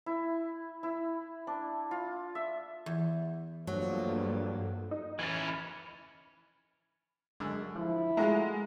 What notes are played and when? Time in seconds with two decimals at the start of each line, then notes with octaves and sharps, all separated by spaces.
0.06 E4
0.83 E4
1.47 D4
1.91 F4
2.35 E5
2.86 E2
3.67 G2 F3 F#3 A3 A#3
4.91 D#4
5.19 E3 C#4 G#6 A6
5.47 B5 F6
7.40 F#2 D3 G#3
7.76 F3 E4
8.17 G#3 A3 F4 F#4 A#5